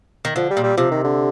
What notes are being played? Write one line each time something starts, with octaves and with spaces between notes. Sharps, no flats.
D#3
D3 F3
G3
A#2
G3
C3 F3
D#3
D3